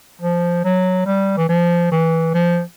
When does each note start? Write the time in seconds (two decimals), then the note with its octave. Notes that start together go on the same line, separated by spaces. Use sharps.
0.21 F3
0.65 F#3
1.06 G3
1.37 E3
1.49 F3
1.92 E3
2.35 F3